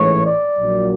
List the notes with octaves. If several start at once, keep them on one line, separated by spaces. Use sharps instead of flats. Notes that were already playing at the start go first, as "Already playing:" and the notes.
Already playing: A1 G#2 E3 A3 C#5
D5
A#1 A#2 F#3